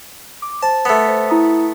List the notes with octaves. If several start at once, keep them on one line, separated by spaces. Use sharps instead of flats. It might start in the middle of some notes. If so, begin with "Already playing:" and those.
D6
C5 A5
A3 B3
C5
E4 A#5 D#6